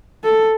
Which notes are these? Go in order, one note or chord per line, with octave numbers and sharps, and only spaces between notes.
A4